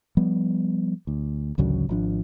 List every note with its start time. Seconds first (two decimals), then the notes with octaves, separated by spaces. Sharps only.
0.17 F3 G3 B3
1.07 D2
1.58 A1 D2 C#3 F#3
1.89 G#1 F3 D4